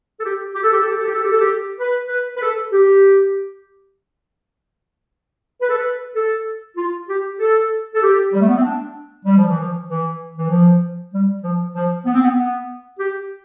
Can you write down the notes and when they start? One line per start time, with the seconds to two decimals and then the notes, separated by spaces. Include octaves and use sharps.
0.19 A4
0.24 G4
0.54 G4
0.63 A4
0.73 G4
0.81 A4
0.90 G4
0.98 A4
1.07 G4
1.14 A4
1.24 G4
1.32 A4
1.40 G4
1.79 B4
2.07 B4
2.37 B4
2.42 A4
2.73 G4
5.62 B4
5.69 A4
5.78 B4
6.15 A4
6.77 F4
7.09 G4
7.40 A4
7.95 A4
8.02 G4
8.33 G3
8.41 A3
8.48 B3
8.56 C4
8.64 D4
9.26 G3
9.38 F3
9.49 E3
9.60 F3
9.88 E3
10.37 E3
10.50 F3
11.13 G3
11.43 F3
11.75 F3
12.06 B3
12.15 C4
12.23 B3
12.37 B3
12.99 G4